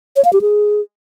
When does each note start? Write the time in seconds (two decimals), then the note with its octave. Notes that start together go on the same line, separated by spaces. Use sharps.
0.16 C#5
0.25 F5
0.33 G4
0.41 G#4